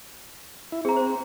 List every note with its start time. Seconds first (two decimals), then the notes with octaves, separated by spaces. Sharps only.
0.72 E4
0.85 C4 G#4 A#5
0.96 C5